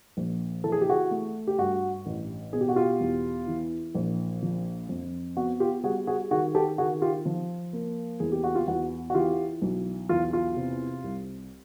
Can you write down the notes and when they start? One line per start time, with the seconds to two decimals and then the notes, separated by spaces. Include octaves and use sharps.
0.17 A#1
0.64 E3 A4
0.72 G#4
0.81 G4
0.89 F#4 G#4
1.11 A3
1.47 G4
1.58 G2 F#4
2.06 A1
2.53 B2 G#4
2.61 G4
2.69 F#4
2.76 F4 G4
3.00 E2
3.47 E3
3.95 A#1
4.43 F3
4.89 F2
5.37 B3 F#4
5.60 F4 G4
5.84 G3 F#4 G#4
6.07 F#4 G#4
6.31 D#3 F#4 G#4
6.55 G4 A4
6.78 D#3 F#4 G#4
7.02 F4 G4
7.26 F3
7.73 A#3
8.20 E2 G#4
8.32 G4
8.44 F#4
8.55 F4 G4
8.67 E2 F#4
9.10 F#4
9.14 E3 F4 G4
9.62 B1
10.09 E2 F4
10.33 F4
10.56 C3
11.04 C2